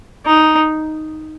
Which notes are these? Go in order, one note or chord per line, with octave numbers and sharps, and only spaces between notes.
D#4